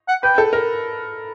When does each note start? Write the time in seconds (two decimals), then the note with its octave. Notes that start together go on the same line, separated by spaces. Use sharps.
0.08 F#5
0.23 B4 G5
0.38 A4
0.53 A#4